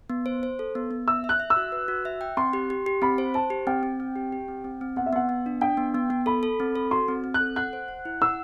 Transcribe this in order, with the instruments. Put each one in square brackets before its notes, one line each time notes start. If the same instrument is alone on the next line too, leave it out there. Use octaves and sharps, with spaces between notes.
[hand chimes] B3
C5
C5
A4
B3
B3
[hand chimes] E5 [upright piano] E6
[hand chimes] E5
[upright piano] F#6
[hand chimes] E5
[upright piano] E6
[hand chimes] F#4
B4
F#4
E5
G5
[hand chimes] C4 [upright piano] C6
[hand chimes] G4
G4
G4
[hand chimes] C4 [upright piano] B5
[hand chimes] C5
[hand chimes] C5 [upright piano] A5
[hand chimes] G4
[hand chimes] C4 [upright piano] G5
[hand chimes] C4
C4
G4
G4
C4
C4
C4
[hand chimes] B3 [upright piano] F#5
[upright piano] E5
[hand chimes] B3 [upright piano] F#5
[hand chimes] B3
D4
[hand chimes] D4 [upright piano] G5
[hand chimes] B3
B3
B3
[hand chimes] A4 [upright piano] B5
[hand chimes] A4
C4
A4
[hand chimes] F#4 [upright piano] C6
[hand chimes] C4
C4
[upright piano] F#6
[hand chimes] A4
[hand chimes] F#5 [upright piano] F#6
[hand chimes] C5
F#5
E4
[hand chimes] F#5 [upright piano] E6